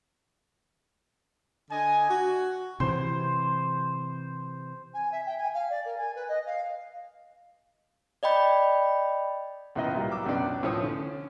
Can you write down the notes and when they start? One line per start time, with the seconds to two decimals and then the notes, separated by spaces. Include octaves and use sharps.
1.71 D3 D#5 G#5
2.10 F#4
2.80 C3 E3 C5
4.93 G#5
5.11 E5
5.26 G5
5.37 G#5
5.53 F5
5.70 D5
5.84 A#4
5.97 G#5
6.15 B4
6.28 D#5
6.45 F5
8.23 D5 D#5 G5 B5 G6
9.76 C#2 A#2 E3 B3 E4 D#5
9.95 A#2 G3
10.11 F#3 D6 E6
10.26 C#2 F#2 B2 B3 D4 D5
10.63 A2 F3 C5 C#5 D#6
10.83 D3 C#4